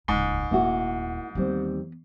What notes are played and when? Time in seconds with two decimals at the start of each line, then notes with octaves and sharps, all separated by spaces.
0.08 D#1 C#2 G#2
0.51 D#1 A#3 E4 F#4
1.35 D#2 E3 G3 B3 C4